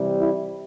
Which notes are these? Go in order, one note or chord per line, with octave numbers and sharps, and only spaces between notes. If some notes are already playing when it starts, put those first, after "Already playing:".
Already playing: C3 E3 G3
E4